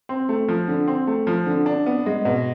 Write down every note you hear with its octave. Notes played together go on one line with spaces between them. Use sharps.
C4
A3
F3
D3
C4
A3
F3
D3
D4
B3
G#3
B2